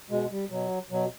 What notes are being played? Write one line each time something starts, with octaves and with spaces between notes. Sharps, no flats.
B2 G#3
G3
B2 F#3
B2 F#3